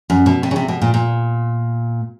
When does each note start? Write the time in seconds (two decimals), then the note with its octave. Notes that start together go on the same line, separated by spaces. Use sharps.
0.10 F#2
0.26 B2
0.43 C3
0.51 C#3
0.56 C3
0.68 B2
0.82 A#2
0.94 A#2